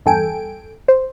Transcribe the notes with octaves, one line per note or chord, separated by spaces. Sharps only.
E2 G2 A4 G5 G#5 D7
C5